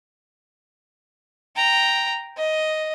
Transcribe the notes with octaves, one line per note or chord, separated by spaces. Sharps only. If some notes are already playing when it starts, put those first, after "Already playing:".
G5 A#5
D#5